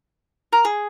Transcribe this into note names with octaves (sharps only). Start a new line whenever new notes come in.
A#4
G#4